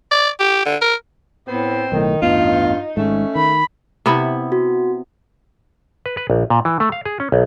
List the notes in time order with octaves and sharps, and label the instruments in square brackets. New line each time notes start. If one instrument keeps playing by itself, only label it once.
[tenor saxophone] D5
G4
D3
A#4
[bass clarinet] A2 [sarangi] B3 [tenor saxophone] C4
[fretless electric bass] B1 A2 [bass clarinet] D#3 [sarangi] D#4
[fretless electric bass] A1 E2 B3 [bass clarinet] G2 [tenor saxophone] F4
[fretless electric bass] G#1 G#2 [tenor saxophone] A3 [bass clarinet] C#4
[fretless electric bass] D#3 [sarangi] B5
[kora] C3 B3 E4
[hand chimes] F#4
[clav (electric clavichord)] B4
B4
A#1
A#2
E3
A3
F5
G#4
C#4
B1